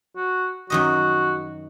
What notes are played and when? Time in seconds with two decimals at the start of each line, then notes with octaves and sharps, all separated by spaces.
0.16 F#4
0.70 F#2 D#3 F#4 D#5